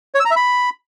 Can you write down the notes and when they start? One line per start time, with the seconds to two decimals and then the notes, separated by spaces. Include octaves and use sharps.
0.14 C#5
0.20 E6
0.25 A#5
0.31 E5
0.36 B5